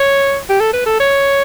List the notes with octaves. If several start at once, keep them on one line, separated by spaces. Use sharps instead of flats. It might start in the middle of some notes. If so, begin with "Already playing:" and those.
Already playing: C#5
G4
A4
B4
A4
C#5